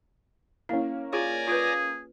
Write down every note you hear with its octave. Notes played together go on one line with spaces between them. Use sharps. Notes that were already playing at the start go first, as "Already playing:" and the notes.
A#3 C#4 E4
F4 G#4 C#5 D5 G#5 A#5
F4 G#4 B4